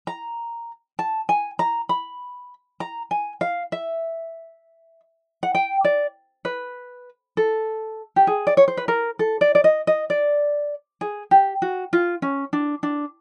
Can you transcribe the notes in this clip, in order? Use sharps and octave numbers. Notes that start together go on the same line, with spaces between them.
A#5
A5
G#5
A#5
B5
A#5
G#5
F5
E5
F#5
G5
D5
B4
A4
G4
G#4
D5
C#5
C5
B4
A#4
A4
D5
D5
D#5
D#5
D5
G#4
G4
F#4
F4
C#4
D4
D4